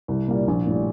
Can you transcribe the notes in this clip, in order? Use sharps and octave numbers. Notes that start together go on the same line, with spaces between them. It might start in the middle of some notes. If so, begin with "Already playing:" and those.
C2
A#2 G3 A#3
A#1
A2 G3